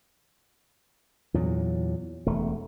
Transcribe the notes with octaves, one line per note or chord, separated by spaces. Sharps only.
E2 A#2 F#3
E1 A3